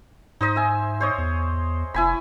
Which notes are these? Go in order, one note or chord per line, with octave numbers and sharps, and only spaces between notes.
G#2 D#4 C5 D#5
E5 G#5
C5 C#5 D#5
E2
F1 E4 G#5 B5